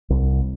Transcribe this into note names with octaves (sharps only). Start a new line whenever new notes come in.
C2